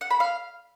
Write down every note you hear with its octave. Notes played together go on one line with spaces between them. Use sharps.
F#5
B5
F5